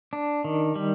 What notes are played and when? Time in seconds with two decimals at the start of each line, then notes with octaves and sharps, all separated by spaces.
0.13 D4
0.44 D#3
0.76 G3